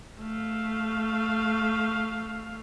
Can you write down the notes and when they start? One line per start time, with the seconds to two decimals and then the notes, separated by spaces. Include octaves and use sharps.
0.22 A3 F5